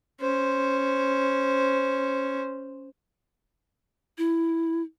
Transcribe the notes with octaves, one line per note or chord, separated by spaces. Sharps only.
C#4 C5
E4